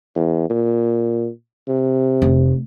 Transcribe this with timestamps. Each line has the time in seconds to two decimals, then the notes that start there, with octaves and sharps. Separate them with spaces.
0.16 E2
0.50 A#2
1.67 C3
2.22 F1